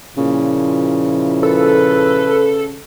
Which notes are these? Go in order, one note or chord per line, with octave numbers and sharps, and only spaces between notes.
A#2 C#3 F3 E4
A4 B4